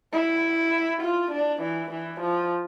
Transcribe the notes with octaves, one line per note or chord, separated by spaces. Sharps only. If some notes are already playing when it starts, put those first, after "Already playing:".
E4
F4
D4
E3
E3
F3